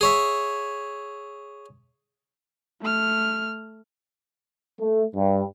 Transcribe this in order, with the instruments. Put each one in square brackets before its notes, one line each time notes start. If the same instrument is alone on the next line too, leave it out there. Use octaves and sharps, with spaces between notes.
[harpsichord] G#4 C#5 E5
[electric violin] A3 F6
[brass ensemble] A3
G2